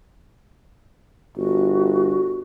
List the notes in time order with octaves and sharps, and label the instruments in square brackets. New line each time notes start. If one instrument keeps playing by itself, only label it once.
[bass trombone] G1 [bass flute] F#4